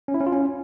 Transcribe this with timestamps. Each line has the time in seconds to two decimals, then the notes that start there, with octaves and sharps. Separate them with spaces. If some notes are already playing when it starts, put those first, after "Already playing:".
0.08 C#4
0.14 E4
0.20 C#4
0.26 F4
0.33 C#4